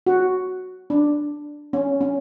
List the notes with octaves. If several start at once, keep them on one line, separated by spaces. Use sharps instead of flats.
F#4
D4
C#4
C#4